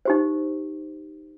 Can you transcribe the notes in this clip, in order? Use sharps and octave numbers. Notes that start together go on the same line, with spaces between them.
D#4 G4 C5